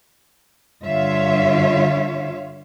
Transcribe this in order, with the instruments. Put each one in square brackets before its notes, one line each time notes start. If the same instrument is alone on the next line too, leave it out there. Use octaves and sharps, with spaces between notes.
[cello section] G2 D3 F4 C#5 E5 F5